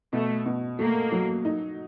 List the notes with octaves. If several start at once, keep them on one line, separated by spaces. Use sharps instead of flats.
B2 A3
B2
A3 A#3
F#3
D#4